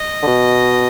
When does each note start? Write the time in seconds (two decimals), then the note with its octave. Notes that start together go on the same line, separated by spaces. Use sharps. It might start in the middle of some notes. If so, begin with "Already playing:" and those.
Already playing: D#5
0.23 D3
0.27 B2